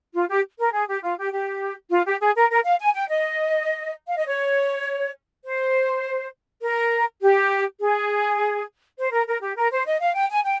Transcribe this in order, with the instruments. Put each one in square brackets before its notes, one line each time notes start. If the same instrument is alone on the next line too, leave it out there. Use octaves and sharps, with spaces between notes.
[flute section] F4
G4
A#4
G#4
G4
F4
G4
G4
F4
G4
G#4
A#4
A#4
F5
G#5
G5
D#5
F5
D#5
C#5
C5
A#4
G4
G#4
C5
A#4
A#4
G4
A#4
C5
D#5
F5
G5
G#5
G5